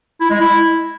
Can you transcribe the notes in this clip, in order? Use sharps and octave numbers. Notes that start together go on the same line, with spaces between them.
E4
G#3
E4